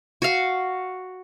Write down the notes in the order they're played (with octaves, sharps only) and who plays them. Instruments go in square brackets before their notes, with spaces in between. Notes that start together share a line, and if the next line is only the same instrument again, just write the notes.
[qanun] F#4 F5